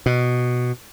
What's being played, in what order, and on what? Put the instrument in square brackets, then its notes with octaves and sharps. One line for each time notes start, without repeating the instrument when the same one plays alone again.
[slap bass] B2